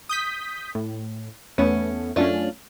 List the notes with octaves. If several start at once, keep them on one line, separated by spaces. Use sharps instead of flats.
D#6 G6 B6
A2
E2 A3 B3 C#4
F#2 A3 C#4 D4 F4